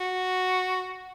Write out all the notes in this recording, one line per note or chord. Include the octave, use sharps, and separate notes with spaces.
F#4